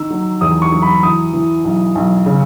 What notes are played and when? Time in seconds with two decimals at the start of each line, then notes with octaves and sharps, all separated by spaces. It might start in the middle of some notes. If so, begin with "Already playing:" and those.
Already playing: D#3 E6
0.10 F#3
0.41 E2 D#6
0.62 C#6
0.72 F#3
0.82 B5
1.03 E3 D#6
1.33 E3
1.65 B1
1.95 B1
2.26 C#3